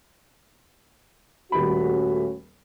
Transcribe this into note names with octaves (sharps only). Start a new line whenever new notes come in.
D#1 G3 A3 C#4 F#4 B5